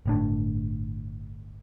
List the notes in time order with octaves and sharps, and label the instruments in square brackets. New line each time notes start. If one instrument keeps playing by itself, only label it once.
[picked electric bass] G1 A2 D4